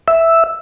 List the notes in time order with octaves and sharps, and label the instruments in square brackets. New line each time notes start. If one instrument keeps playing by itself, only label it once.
[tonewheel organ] E5